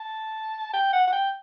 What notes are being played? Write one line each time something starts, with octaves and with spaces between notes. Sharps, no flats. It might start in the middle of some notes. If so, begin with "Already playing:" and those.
Already playing: A5
G5
F#5
F#5
G5